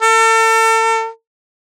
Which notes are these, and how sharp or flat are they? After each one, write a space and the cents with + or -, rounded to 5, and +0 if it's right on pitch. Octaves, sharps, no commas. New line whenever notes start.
A4 +35